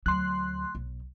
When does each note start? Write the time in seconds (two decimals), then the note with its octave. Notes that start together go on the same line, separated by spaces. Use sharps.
0.06 D2 F#3 C6 F#6
0.75 B1